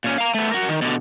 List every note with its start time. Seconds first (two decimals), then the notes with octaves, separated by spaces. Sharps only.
0.04 A#2 C#4
0.18 F5 A#5
0.34 A3 B3
0.51 F#4 A#4
0.69 D#3
0.82 B2 D3